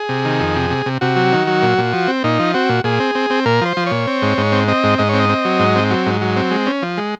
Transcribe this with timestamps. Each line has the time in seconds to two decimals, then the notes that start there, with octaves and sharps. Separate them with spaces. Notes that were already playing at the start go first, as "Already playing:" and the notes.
Already playing: G#4
0.09 C3
0.25 D#3
0.40 F2
0.56 C3
0.70 C3
0.86 C3
1.01 C3 F#4
1.16 F#3
1.32 D#3
1.47 F#3
1.62 A#2
1.78 A#2
1.93 F3
2.08 C4
2.24 A#2 D#4
2.39 F3
2.54 C4 F#4
2.69 A#2
2.84 A#2 G#4
3.00 C4
3.15 C4
3.30 C4
3.45 A#2 A#4
3.61 F3 C5
3.77 F3
3.86 A#2 C#5
4.07 C4
4.22 G#2
4.38 G#2
4.52 C4
4.68 C4 D#5
4.84 G#2
4.98 G#2 D#5
5.09 C4 C#5
5.19 D#5
5.29 C4
5.45 F#3
5.59 G#2
5.76 C4
5.91 F#3
6.06 G#2
6.21 F#3
6.36 C4
6.51 G#3
6.66 C#4
6.82 F3
6.97 G#3